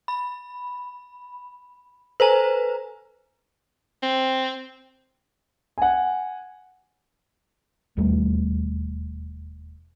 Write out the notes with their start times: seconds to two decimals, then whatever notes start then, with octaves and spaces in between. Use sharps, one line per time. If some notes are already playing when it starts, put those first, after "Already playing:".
0.08 B5
2.20 A4 B4 C5 G#5 A#5
4.03 C4
5.78 F#5 G#5
7.97 E1 D#2 G3 A3